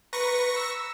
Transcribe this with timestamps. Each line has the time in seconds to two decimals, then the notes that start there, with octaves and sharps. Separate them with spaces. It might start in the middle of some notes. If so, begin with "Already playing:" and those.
0.13 B4 A#5 C#6 A#6 B6 C#7
0.56 E6